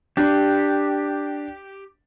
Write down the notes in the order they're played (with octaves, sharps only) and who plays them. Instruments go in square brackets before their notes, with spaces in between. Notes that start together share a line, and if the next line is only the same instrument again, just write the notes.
[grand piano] D4 [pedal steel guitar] G4